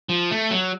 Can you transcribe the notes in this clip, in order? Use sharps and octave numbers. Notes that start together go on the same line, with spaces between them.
F3
A3
F#3